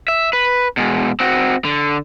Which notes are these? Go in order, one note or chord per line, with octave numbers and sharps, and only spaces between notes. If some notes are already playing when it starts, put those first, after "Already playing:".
E5
B4
B2 G#3
C4 F#4
D3